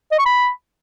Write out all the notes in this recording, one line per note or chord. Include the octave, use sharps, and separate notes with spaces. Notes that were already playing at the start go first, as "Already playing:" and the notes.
D#5
C#6
B5